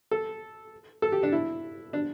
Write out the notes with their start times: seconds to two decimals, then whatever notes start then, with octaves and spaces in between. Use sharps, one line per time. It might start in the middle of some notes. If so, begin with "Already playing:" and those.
0.11 A4
1.02 A4
1.12 G4
1.23 D4
1.32 E4
1.93 D4